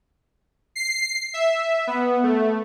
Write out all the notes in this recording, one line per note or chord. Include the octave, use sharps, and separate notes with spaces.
C7
E5
B3
A3